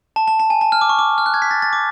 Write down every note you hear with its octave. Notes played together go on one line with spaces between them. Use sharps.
A5
A5
A5
G#5
A5
F6
D6
C#6
D6
F6
F#6
G#6
B6
A6
A6
D6